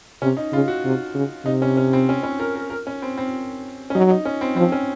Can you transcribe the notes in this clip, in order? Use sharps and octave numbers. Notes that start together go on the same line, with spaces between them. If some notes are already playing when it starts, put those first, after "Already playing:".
C3 C#4
D#4
C#3 F4
F#4
C3
C#3
C3 D#4
C#4
C#4
C4
C#4
C#4
A#4
A#4
A#4
C#4
C4
C4
C#4
F#3 D#4
D#4
C#4
C4
F3 C4
C#4